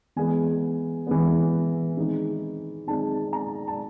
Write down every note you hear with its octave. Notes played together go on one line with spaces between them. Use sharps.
E3 G#3 B3 G#5
E3 G#3 B3
D#3 G#3 C4 D#4
D#3 G#3 C4 D#4 A5
A#5
A5